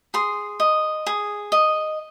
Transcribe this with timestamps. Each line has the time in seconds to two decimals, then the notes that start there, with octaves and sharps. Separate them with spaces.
0.14 G#4 C6
0.60 D#5
1.06 G#4
1.52 D#5